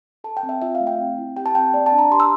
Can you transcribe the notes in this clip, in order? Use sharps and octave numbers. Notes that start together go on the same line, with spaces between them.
A4 A5
G5
C4
E5
F4 E5
F5
A3
G5
C4
E4
G4 G5
A5
C4 G5
A#3 D5
A5
D4
A#5
G4 C6
E6